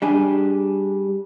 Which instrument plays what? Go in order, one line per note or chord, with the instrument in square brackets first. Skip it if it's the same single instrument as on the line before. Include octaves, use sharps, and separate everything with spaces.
[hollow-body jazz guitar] G3 D4 G#4